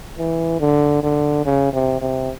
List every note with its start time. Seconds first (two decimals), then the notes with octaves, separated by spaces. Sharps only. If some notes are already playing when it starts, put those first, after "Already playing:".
0.18 E3
0.60 D3
1.03 D3
1.46 C#3
1.73 C3
2.01 C3